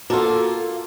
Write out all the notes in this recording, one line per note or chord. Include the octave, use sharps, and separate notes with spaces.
A#3 F4 F#4 A4